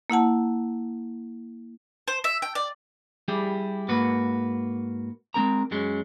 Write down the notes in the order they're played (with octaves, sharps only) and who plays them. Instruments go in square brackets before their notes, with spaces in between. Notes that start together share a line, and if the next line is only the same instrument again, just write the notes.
[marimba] A#3 E4 F#5 A5
[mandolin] C5
E5
G5
D5
[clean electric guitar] G3 E4 G4 G#4
G#2 A#3 F#4 B4
G#3 C4 A#4 A#5
F#2 F#3 G#3 C#4